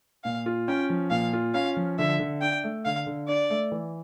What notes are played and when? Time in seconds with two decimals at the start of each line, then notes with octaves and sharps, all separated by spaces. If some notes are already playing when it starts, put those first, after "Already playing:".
0.24 A#2 F5
0.46 F4
0.68 C#4 G5
0.90 F3
1.11 A#2 F5
1.33 F4
1.54 C#4 F5
1.77 F3
1.98 D3 E5
2.19 D3
2.41 D4 G5
2.64 A3
2.85 D3 F5
3.06 D3
3.28 D4 D5
3.50 A3
3.72 E3